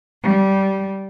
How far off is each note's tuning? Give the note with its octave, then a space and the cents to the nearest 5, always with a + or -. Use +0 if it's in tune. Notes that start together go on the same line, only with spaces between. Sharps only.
G3 -15